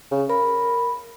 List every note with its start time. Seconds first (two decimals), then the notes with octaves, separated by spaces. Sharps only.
0.11 C#3
0.30 A#4 B5